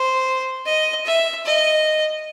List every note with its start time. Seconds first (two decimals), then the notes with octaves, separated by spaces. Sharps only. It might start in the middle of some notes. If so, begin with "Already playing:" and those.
Already playing: C5
0.66 D#5
1.06 E5
1.45 D#5